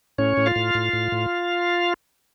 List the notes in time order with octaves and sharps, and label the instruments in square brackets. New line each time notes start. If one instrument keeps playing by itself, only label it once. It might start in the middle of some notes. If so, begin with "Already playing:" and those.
[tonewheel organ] A2 C#4 C#5
A2
F4 F5
A2
A2
A2
A2